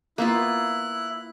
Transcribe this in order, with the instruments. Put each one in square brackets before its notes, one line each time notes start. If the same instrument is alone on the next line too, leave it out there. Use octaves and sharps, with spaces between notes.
[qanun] A#3 B3 F4 [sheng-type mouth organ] E4 F#6